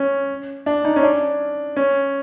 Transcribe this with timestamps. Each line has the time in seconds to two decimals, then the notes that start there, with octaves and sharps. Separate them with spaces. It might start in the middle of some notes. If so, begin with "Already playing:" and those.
Already playing: C#4
0.66 D4
0.85 D#4
0.96 C#4
1.03 D4
1.76 C#4